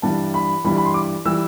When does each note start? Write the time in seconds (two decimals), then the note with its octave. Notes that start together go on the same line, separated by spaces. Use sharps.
0.02 G2 E3 G3 A5
0.34 B5
0.64 G2 E3 G3 B5
0.77 B5
0.85 C6
0.94 D6
1.25 E3 G3 E6